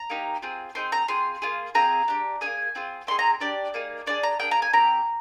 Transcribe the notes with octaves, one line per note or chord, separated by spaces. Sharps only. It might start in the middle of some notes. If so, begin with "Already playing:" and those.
Already playing: A#5
A#3 D#4 G4
C4 F4 G#4
C4 D#4 G#4 C6
A#5
C4 F4 G#4 C6
A#3 F4 G#4
C4 F4 G#4 A#5
D4 G4
A#3 D#4 G#4 G#5
C4 F4 G#4
C4 D#4 G#4 C6
A#5
D4 G4 D5
A#3 D#4 G#4
D4 F4 G#4 D5
A#5
A#3 D4 G#4 G5
A#5
G#5
C4 G4 A#5